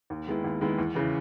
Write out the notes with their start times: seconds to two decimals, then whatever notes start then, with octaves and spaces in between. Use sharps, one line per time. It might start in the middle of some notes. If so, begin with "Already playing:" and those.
0.10 D#2
0.28 D#3 G#3 B3 E4
0.44 D#2
0.61 D#3 G#3 B3 E4
0.78 E2
0.95 C#3 E3